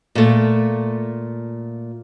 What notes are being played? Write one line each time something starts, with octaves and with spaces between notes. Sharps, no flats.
A#2 A3